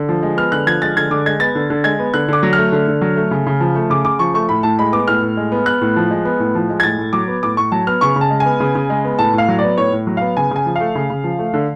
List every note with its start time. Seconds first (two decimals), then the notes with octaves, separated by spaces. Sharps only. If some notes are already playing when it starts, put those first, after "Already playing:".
Already playing: D3
0.09 F3
0.23 G#3
0.37 B3 F6
0.52 D3 F#6
0.67 F3 G#6
0.82 G#3 A6
0.97 D3 G#6
1.11 D3 D6
1.26 G#3 G#6
1.40 B3 A6
1.55 D3
1.70 D3
1.84 G#3 G#6
1.99 B3
2.14 D3 F#6
2.28 D3 D6
2.43 F#3
2.53 A3 F6
2.72 D3
2.88 D3
3.01 F#3
3.16 A3
3.31 C#3
3.46 C#3
3.60 F3
3.75 A3
3.90 C#3 D6
4.05 C#3 D6
4.19 F3 C#6
4.34 A3 C#6
4.49 A2 B5
4.63 A2 A5
4.79 G#3 B5
4.93 B3 D6
5.08 A2 F6
5.22 A2
5.37 G#3
5.52 B3
5.66 B3 F#6
5.81 A2
5.96 F3
6.11 G#3
6.25 B3
6.40 A2
6.55 F3
6.70 G#3
6.80 G#6
6.83 A2 A6
6.98 A2
7.13 F#3 D6
7.28 B3
7.43 A2 D6
7.57 A2 C#6
7.72 F#3 A5
7.87 B3 F6
8.01 C#3 C#6
8.16 C#3
8.21 A5
8.30 G#3
8.40 G#5
8.45 B3
8.60 C#3
8.75 C#3
8.90 G#3
9.05 B3
9.19 A2 A5
9.33 A2 F5
9.48 F#3
9.59 B3 D5
9.78 A2 C#5
9.92 A2
10.07 F#3
10.17 B3 F5
10.37 C#3 G#5
10.51 C#3 G#5
10.66 F3
10.76 A3 F5
10.95 C#3
11.10 C#3
11.24 F3
11.39 A3
11.54 D3